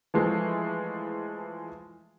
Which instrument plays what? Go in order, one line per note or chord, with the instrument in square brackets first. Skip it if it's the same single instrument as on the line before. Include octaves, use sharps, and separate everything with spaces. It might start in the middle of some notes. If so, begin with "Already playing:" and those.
[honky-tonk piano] E3 F3 G#3 A3